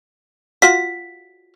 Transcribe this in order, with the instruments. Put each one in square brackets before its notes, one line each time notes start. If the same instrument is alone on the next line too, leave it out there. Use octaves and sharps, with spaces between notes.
[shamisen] F4 F#4 [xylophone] B6